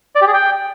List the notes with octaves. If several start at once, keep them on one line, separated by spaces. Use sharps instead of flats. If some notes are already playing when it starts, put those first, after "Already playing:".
D5
G4
G#4
G5